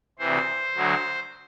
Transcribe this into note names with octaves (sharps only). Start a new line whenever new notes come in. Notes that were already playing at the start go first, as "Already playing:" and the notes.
D2 C3 E3 C5
D2 D3 F#3